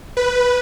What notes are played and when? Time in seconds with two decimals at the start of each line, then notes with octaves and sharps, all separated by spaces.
0.17 B4